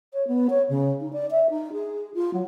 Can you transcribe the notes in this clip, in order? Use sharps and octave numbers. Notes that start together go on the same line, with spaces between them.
C#5
B3
C#5
C#3
D#4
D5
E5
D#4
G#4
F4
F#3